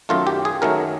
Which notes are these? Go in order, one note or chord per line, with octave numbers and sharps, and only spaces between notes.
F#2 D#3 F#3 A3 F4
G4
G#4
F#2 D#3 F#3 A3 A#4